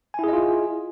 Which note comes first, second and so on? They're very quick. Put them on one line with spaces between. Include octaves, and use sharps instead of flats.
G#5 E4 G#4 D#5 F4